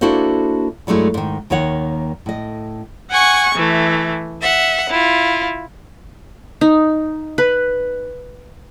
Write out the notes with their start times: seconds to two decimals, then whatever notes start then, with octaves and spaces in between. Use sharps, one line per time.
0.01 A#3 D4 E4 F#4 A4 C5
0.87 G2 F#3 G#3 A3 E4
1.14 G#2 D#3
1.50 D#2 D#3 A#3 C#5 F#5
2.26 A2 D#5
3.10 F#5 G#5 C#6
3.55 E3 A3
4.42 E5 F#5
4.90 E4 F4
6.61 D#4
7.38 B4